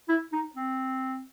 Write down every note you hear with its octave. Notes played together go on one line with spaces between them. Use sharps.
E4
D#4
C4